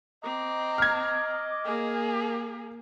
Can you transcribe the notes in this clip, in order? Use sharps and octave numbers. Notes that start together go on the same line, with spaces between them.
C4 D#5 A#5 D6
F6 G#6
A#3 G#4